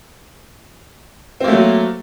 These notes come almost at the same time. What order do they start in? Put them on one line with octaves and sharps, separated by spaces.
C4 A#3 A3 F#3